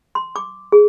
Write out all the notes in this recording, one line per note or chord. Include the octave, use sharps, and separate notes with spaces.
C6
D6
G#4